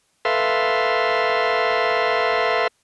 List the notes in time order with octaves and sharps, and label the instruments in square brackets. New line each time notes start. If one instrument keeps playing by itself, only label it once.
[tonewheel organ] A4 B4 E5 F5 C6